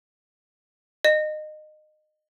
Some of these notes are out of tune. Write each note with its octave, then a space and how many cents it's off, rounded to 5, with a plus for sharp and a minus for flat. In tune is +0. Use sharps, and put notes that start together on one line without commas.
D#5 -25